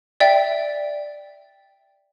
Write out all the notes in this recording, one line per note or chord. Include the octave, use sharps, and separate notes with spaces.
D5 E5 G5